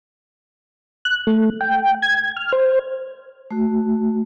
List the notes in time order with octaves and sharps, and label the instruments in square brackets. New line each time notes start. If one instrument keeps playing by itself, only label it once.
[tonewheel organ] F#6
A3
G5
G#6
F6
C5
[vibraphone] A3 F#4